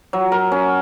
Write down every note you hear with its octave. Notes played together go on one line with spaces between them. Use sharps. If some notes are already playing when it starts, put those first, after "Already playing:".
F#3
A#4
C#4